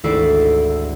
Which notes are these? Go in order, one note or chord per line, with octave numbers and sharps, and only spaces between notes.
G#1 D2 E4 A4 D5 C7